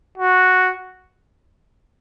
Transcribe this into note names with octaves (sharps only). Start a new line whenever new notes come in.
F#4